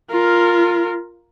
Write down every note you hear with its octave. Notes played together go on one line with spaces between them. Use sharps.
F4 A#4